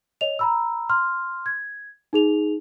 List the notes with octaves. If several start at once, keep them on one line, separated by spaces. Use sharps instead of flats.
C#5 D#5 F7
A#5 B5 E6
C6 F6
G#6
D#4 G#4 F7